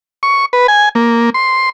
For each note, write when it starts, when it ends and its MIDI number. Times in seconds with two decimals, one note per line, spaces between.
0.23 0.46 85
0.53 0.67 71
0.68 0.89 80
0.95 1.30 58
1.34 1.69 84